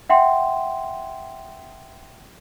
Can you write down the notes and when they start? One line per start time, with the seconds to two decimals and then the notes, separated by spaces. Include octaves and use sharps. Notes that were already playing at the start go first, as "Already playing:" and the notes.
0.10 E5 F#5 G5 C6